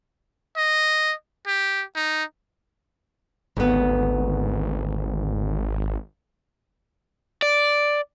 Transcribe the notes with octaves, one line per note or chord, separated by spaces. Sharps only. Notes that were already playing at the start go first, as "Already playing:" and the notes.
D#5
G4
D#4
G#1 D2 B3
D5